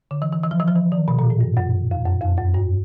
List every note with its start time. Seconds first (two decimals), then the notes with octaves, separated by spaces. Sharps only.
0.11 D3
0.22 E3
0.32 E3
0.43 E3
0.51 F3
0.60 E3
0.68 F3
0.76 E3
0.92 D#3
1.08 B2
1.19 A#2
1.30 A2
1.41 G2
1.57 F#2
1.91 F2
2.05 F#2
2.21 F2
2.37 F#2
2.54 G2